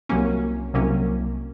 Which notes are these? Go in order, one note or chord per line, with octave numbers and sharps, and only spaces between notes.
C2 C3 F#3 A#3 C#4
C2 C3 F#3 A#3 C#4